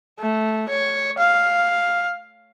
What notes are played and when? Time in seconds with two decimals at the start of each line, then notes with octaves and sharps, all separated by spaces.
0.19 A3
0.69 C#5
1.18 F5